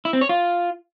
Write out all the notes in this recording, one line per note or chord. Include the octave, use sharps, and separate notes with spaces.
E4
C4
C#5
F4